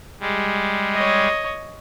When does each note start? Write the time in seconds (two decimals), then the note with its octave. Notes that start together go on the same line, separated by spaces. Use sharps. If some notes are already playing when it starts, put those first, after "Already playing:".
0.20 G3 G#3
0.94 C#5 D#5